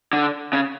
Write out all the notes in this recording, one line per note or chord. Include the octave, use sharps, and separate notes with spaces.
D3
C#3